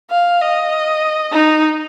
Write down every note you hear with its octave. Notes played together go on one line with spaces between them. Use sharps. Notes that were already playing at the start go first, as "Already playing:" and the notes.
F5
D#5
D#4